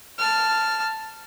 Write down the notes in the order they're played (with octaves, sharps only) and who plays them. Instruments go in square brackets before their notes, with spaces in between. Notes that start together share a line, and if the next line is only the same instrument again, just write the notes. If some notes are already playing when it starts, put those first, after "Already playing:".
[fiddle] A5 F6